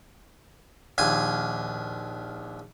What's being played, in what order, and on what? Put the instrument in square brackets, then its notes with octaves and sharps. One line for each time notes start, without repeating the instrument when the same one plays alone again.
[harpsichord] A#1 D#2 G#5